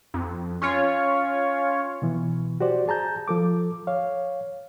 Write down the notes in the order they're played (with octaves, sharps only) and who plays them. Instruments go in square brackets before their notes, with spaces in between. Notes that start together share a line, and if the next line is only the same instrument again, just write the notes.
[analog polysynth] F2
C#4 F4 C#5
[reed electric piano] B2 E3
F#4 G4 C5 D5
G#4 A5 A#5 G6
F3 A4 D6
C#5 F5